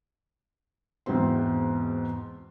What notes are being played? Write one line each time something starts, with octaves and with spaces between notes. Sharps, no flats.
E2 G#2 B2 C4 C6